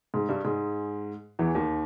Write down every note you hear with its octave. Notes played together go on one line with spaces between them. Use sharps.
G#2 G#3
G2 G3
G#2 G#3
E2 E3
D#2 D#3